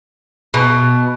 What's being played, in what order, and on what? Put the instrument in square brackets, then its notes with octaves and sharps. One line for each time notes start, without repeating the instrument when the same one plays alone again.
[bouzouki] B2